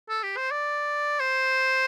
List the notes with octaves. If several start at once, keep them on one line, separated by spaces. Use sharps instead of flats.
A4
G4
C5
D5
C5